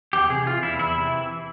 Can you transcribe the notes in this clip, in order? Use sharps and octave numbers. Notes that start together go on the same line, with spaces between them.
E2 G4
C3 G#4
E3 F4
E2 E4
E2 E4
C3
E3